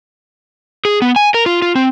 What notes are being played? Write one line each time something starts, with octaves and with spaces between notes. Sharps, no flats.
G#4
B3
G#5
A#4
F4
F4
C4